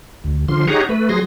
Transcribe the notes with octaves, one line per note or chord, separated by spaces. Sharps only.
D2
D3 F3 C6
D#4 G4 G#4 C#5 F#5 A#5
A3 B4
F#3 G#4 C6 A#6